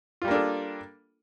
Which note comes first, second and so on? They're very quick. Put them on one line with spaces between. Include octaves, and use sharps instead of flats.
F4 G3 A#3 D4 A4